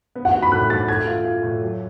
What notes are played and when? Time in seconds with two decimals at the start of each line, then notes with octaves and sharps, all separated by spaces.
0.15 B3
0.25 F#5
0.34 F#4
0.42 B5
0.52 A2 F#6
0.70 F#4 A6
0.88 A3 G#6
1.07 F4
1.25 F4
1.43 A2
1.61 F#3